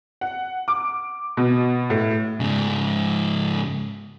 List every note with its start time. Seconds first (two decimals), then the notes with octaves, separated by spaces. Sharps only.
0.21 F#5
0.68 D6
1.37 B2
1.90 A2
2.40 G#2 C#3